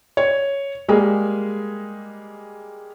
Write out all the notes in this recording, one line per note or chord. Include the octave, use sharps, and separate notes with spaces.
C#5
G3 G#3 A#3 G#4